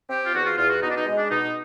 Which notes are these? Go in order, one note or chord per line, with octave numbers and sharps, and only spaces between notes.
C4 G4
F4
E2 F#4
F4
E2 F4
F#4
B2 D#4
D4
D#4
G#3
D4
B2 D#4